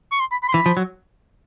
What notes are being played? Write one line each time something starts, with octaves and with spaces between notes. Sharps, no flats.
C#6
C6
B5
B5
C6
E3 B5
F3
F#3